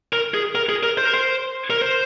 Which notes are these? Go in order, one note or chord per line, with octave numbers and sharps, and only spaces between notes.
A#4
G#4
A#4
G#4
A#4
C5
A#4
C5
A#4
C5